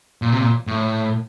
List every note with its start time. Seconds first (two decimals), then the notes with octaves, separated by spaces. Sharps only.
0.22 A#2
0.31 C3
0.39 A#2
0.67 A2